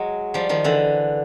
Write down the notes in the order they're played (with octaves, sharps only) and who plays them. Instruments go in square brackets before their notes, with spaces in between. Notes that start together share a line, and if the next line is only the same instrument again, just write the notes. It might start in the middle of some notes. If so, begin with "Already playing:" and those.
Already playing: [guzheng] F#3 G#3
F3 G3
D#3 F3
D3 E3